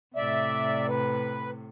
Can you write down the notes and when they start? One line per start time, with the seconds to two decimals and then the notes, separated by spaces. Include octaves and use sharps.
0.16 A2 C3 D5 E5
0.88 B4